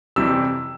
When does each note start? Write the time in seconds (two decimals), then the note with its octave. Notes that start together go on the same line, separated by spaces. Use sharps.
0.16 F2 C3 E3 G3 E6